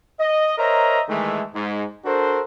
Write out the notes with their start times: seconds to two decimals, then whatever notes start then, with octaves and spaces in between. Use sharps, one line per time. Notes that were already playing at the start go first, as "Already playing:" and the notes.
0.20 D#5
0.58 A#4 C5 C#5 D#5 E5 A#5
1.09 D#3 E3 G#3 A3
1.54 G#2
2.05 D4 F#4 A4 A#4 C5